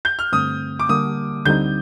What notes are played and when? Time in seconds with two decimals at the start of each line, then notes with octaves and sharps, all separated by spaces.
0.05 G6
0.19 F6
0.32 G2 D3 A3 C4 D#6
0.79 D6
0.89 D3 G3 A#3 D#6
1.45 D2 D3 G3 C4 D#4 G6